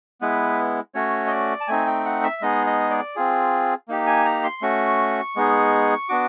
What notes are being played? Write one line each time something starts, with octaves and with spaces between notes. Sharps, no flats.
G#3 B3 E4 B4
A3 C#4 F#4 C#5
D#5
D5
A5
A3 C4 D#4 G#5
G5
F#5
E5
G#3 B3 D#4 G#4 D#5
D#5
D5
C4 F4 G#4
A#3 D#4 G4
G#5
A#5
C6
A3 C#4 F#4 C#6
G#3 B3 D#4 G#4
B3 D4 F#4 D6